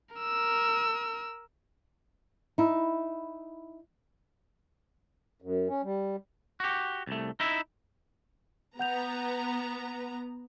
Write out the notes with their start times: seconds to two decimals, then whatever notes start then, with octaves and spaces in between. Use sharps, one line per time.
0.15 A#4 E6
2.58 D#4 E4
5.42 F#2
5.69 C#4
5.83 G3
6.60 F#4 G4
7.07 C2 A3
7.40 D#4 E4 E5
8.79 B3 F#5 A#5 G6 F7